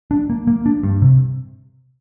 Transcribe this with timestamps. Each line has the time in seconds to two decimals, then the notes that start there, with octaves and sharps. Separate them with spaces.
0.11 D4
0.30 A#3
0.47 A#3
0.66 D4
0.83 G2
1.02 C3